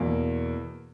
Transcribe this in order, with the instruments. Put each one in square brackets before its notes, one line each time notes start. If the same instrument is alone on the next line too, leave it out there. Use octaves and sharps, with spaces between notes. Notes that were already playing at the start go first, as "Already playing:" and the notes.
Already playing: [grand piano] E2 B2 A#3